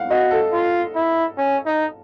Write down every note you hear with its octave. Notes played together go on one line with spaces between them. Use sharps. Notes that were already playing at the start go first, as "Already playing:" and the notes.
Already playing: F5 F#5
F#4 D#5
A4
F4
E4
C#4
D#4